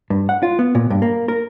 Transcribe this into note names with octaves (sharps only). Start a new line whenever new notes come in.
G2
F#5
F4
B3
A#2
G2
A#3
A#4